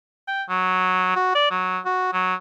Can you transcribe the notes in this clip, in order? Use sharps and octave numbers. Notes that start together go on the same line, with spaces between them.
G5
F#3
F#4
D5
F#3
F#4
F#3